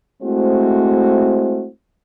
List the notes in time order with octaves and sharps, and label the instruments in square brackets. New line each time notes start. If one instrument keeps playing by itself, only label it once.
[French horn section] G#3 A3 C4 E4 F#4 C5